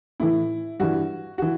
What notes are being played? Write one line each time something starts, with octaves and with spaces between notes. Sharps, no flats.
A2 E3 E4
G2 E3 F#4
E3 F#4